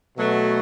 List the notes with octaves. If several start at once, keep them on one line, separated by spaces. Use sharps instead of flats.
B2 F#3 A3